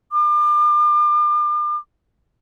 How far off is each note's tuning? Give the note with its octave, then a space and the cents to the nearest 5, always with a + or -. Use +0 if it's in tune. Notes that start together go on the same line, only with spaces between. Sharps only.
D6 +40